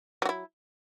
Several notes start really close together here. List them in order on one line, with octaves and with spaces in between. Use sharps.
F#3 F#4 E4